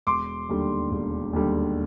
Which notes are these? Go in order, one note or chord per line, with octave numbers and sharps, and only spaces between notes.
E1 C6 D6
D#2 D3 G3
E1
D#2 D3 G3